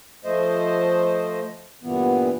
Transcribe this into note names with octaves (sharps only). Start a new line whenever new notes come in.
F3 A3 C5 D#5
G2 A#2 E3 B3